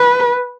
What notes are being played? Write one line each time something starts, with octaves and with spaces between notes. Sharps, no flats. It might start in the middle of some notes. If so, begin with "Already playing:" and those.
Already playing: B4